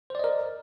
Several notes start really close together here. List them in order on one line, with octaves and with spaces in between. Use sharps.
C5 D5 D#5 A#4